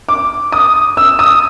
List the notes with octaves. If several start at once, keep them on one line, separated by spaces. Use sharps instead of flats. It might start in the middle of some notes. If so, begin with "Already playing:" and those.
D6
D#6
E6
D#6